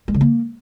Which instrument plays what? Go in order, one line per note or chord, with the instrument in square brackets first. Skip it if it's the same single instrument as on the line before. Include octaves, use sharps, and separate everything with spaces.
[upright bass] G#3
C#3
A#3